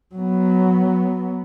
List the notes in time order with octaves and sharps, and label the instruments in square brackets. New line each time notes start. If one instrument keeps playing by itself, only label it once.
[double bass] F#3 B3